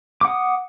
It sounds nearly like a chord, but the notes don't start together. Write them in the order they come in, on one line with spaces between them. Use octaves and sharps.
D6 F#5 D#6